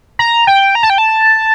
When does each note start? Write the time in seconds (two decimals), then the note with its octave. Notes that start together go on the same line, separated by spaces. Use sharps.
0.19 A#5
0.47 G5
0.75 A#5
0.83 A5
0.90 G5
0.98 A5